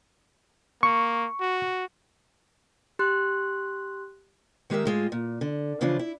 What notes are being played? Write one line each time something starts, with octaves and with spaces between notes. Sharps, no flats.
A#3 C#6
F#4
G4 C6 F#6
D#3 G#3 G4 A#4 E5
A2 G#3 F4
A#2
D3
C#3 E3 F3 D4 F4
E4